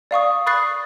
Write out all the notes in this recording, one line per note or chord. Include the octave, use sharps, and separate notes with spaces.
D5 F5 C#6 D#6
B5 C#6 D#6 F#6 A6 C7